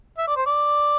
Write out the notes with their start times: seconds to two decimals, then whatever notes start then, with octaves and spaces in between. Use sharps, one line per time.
0.18 E5
0.27 D5
0.37 C5
0.46 D5